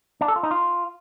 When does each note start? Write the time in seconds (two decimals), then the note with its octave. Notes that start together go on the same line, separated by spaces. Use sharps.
0.21 D4
0.28 A4
0.36 F4
0.43 D#4
0.51 F4